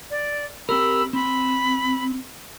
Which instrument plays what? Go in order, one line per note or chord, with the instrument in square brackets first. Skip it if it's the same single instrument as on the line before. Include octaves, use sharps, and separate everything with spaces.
[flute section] D5
[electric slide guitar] C4 G4 A#4 [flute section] B5 E6
[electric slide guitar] C4 [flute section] B5